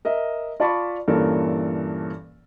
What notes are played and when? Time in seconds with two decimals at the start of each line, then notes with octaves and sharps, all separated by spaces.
0.05 A#4 D#5 E5
0.60 F4 D5 A5 B5 C#6
1.08 G2 A#2 E3 C#4 A4 A#4